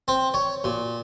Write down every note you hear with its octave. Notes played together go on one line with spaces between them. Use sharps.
C4
C#5
A#2